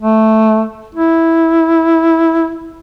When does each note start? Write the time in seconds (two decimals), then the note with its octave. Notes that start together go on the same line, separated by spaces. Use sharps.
0.01 A3
0.95 E4